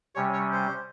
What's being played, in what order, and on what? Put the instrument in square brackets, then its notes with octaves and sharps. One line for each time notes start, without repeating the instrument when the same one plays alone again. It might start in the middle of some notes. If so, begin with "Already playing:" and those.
[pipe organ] C3 G3 C#4 [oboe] C#5
[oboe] C#5
C5